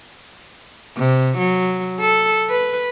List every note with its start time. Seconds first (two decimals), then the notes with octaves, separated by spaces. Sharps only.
0.97 C3
1.38 F#3
2.00 A4
2.49 B4